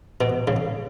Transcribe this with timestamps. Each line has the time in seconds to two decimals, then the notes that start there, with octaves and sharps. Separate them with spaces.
0.21 B2
0.48 C#3